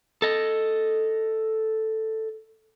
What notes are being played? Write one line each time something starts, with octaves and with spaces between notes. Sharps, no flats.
A4 D#5